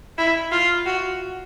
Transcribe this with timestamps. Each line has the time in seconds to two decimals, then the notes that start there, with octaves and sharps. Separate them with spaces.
0.18 E4
0.52 F4
0.86 F#4